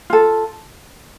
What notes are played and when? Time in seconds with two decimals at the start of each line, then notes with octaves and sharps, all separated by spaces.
0.10 F4 A4